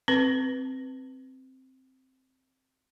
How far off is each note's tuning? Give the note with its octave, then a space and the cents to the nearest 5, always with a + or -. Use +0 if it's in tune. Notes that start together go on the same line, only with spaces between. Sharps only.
C4 +0 B4 +0